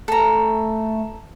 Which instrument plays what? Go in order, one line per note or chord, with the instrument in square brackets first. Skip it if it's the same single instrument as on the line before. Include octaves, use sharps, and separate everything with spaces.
[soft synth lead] A3 [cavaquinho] A4 A#5